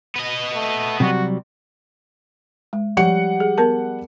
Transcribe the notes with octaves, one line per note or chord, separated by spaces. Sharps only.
B3 D#5
A3
C3 F#3 G3 F#4
G#3
F3 G3 F#5 C#7
G#4
B3 A#4 A5